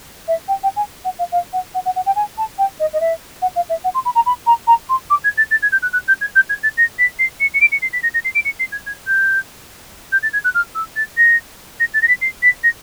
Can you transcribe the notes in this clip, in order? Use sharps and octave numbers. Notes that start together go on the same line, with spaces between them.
E5
G5
G5
G#5
F#5
F5
F5
F#5
F#5
F#5
F#5
G5
G#5
A5
G5
D#5
D#5
E5
F#5
F5
E5
F#5
C6
B5
A#5
B5
A#5
A#5
C6
D6
G#6
A6
A6
G#6
G6
F#6
F#6
G6
G#6
G6
G#6
A6
A#6
B6
C7
C#7
C#7
D7
C#7
C7
B6
A#6
A#6
C7
D7
C#7
C7
G#6
G#6
G6
G6
A6
G#6
F#6
F6
E6
A6
A#6
A#6
A6
A#6
B6
C7
B6
A#6